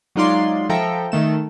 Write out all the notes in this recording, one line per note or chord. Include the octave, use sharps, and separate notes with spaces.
F#3 G#3 D#4 F4 D5 C6
F3 A4 E5 G5 A#5 C#7
D#3 A3 E7